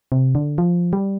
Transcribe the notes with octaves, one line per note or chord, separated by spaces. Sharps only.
C3
D3
F3
G3